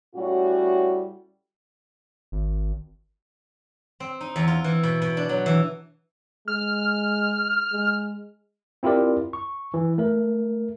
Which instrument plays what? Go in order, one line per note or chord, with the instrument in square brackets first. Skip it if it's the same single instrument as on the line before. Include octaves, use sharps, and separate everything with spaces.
[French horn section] A2 G3 C#4 F#4
[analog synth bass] G#1
[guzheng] C4
D#4
E2
F4
E3
B2
B2
D4
F#3
E3
[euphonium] G#3 [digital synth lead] F6
[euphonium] G#3
[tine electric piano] C4 E4 F4 G4 A#4 D5
C#6
E3
A3 A#4